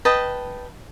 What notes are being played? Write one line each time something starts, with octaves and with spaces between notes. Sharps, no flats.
B4 D#5 G5 A5